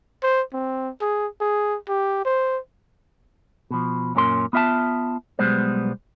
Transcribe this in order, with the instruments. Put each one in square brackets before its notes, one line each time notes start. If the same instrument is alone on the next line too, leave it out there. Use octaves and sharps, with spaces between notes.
[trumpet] C5
C4
G#4
G#4
G4
C5
[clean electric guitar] B2 F3
F#2 A#2 C#4 A#4 C6
B3 F4 E5 F#5 A5
B1 B2 G3 G#3 B3 C5